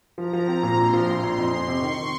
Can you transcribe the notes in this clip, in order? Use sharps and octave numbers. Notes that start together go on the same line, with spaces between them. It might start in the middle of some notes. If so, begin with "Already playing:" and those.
F3 A#5
F3
C4
A#2
A#1 C6
F3
A#1 C6
A#1
F2 C6
F2
C3 C#6
D#3